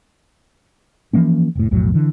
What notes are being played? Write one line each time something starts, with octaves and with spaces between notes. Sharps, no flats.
E3 F3 A#3 C#4
F1 A2
B1 F2 A2 F#3
D3 E3